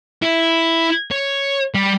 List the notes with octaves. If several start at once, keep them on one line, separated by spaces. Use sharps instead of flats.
E4
C#5
G3